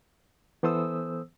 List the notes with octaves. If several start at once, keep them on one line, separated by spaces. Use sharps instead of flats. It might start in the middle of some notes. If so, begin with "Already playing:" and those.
E3 B3 A4 C5 D#6 E6